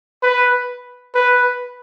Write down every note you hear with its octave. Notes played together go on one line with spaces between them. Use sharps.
B4
B4